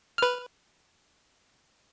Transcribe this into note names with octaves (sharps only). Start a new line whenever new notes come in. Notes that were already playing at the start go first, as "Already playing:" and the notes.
B4 F6